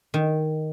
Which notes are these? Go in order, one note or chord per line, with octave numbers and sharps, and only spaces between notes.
D#3